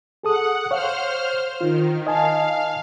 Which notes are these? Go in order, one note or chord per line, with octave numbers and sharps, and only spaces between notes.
G#4 A4 F#5 D#6
C5 C#5 F5 F6
D#3 F4
D#5 F5 G#5 A5